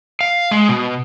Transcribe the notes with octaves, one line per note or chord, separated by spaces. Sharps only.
F5
G#3
B2